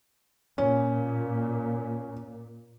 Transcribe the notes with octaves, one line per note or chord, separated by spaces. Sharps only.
A#2 C#4